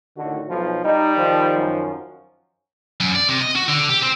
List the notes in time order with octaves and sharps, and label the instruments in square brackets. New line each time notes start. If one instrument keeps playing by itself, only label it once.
[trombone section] A2 D#3 F#4 [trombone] D3
[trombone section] B1 [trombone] F3
[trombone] G3 [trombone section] D#4
[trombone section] D#3 F3
[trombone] F#2
[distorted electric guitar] F#2
D5
C3
D#5
F#4
D3
G4
C4